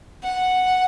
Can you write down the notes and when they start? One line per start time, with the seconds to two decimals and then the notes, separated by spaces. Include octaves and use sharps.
0.23 F#5